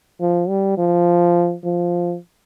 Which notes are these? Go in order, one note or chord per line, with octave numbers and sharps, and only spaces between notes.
F3
G3
F3
F3